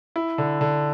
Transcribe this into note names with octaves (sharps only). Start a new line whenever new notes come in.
E4
D3
D3